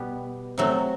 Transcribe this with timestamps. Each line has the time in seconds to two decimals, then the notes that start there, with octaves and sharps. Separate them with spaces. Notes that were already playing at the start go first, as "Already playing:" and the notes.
Already playing: B2 G3 B3 G4
0.58 C3 F#3 A3